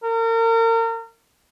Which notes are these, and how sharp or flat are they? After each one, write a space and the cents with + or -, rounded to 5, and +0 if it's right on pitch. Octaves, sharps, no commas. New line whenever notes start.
A#4 -35